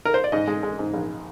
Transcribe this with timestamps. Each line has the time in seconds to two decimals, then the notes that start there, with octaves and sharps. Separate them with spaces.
0.05 A#4
0.14 C5
0.24 D5
0.32 G#2 D#5
0.47 G#3
0.63 G#3
0.79 G#2
0.94 A#1